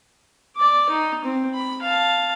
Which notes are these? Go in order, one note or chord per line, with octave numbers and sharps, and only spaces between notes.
D5 D6
D#4
C4
B5
F5 A5